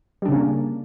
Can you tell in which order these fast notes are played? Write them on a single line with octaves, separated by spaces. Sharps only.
G3 D4 C#3 C#4 A#3